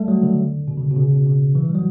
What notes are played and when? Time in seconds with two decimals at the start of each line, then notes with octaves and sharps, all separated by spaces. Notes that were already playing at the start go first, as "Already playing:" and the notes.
Already playing: G3 A3
0.08 F#3
0.23 D3
0.68 B2
0.77 C#3
0.91 B2
0.96 C#3
1.11 B2
1.26 C#3
1.55 E3
1.69 G3
1.75 F#3